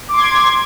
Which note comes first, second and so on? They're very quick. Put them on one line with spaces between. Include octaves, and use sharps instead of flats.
D6 C6 G#6